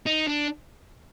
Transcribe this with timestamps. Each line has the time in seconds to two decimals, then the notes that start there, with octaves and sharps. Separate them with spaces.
0.06 D#4
0.27 D4